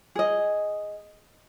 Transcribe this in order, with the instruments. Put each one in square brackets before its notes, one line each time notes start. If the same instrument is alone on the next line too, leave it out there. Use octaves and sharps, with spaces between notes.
[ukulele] G#4 D#5